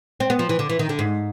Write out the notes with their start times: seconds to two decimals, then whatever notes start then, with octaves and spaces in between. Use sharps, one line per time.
0.20 C4
0.30 B3
0.39 F3
0.49 E3
0.59 D3
0.69 E3
0.79 D#3
0.89 D3
0.99 G#2